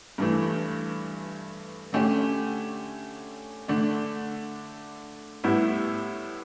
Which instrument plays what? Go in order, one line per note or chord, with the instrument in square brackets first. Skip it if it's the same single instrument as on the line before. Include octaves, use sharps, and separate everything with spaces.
[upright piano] G2 E3 A3
D3 A3 C#4 G4
D3 A3 D4
A2 G3 B3 E4